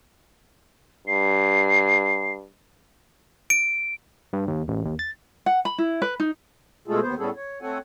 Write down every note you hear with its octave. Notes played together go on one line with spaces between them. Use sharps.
G2 C7
D7
G2
D#2
A1
D#2
A6
F#5
B5
E4
B4
D#4
B2 G#3 A3 F4 G#4 A4
D#2 B3 C5
A2 G3 B3 C#4 G#4 A4
C#5
A3 C4 A4 C#5 F#5 G#5